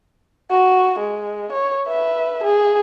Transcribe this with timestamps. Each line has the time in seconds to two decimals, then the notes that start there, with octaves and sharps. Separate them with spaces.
0.50 F#4
0.99 G#3
1.52 C#5
1.87 B4 E5
2.43 G#4